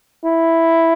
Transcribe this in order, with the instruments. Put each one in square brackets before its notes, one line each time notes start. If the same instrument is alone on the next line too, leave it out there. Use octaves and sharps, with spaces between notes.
[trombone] E4